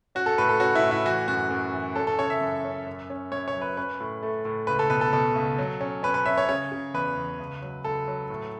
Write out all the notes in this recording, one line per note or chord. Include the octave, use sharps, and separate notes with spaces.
C#4 F#4
A4
A2 B4
A4
C#4 F#4
E4
A2
E4
E3 F#4
F#2 F#4
F#2
E3
C#4 A4
A4
C#3 C#5
E5
F#2
C#4
F#2
C#4
F#2 C#5
C#5
F#3
B4
C#4 B4
A2
A3
A2
C#2 B4
A4
B2 B4
A4
B2 A4
C#2
F#3
C#4
C#4 B4
B4
C#4 E5
C#5
C#3 C#5
C#3
E2 B4
E2
C#2
F#3
C#2 A4
F#3
A2